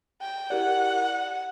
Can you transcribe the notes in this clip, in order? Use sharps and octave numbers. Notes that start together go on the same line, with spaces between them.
G5
E4 G4 A#4 D5 F#5